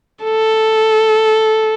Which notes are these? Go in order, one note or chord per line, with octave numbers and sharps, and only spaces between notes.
A4